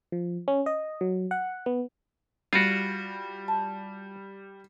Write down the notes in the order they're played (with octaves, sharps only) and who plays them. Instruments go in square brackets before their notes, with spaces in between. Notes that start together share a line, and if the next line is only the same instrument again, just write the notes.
[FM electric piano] F3
C#4
D#5
F#3
F#5
B3
[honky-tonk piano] G3 [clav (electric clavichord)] F4 F#4
[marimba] A5